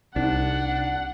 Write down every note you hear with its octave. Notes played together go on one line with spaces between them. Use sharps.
C2 D4 D#4 F#5